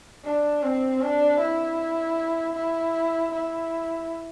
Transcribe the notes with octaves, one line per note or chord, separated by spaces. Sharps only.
D4
C4
D4
E4
E4
E4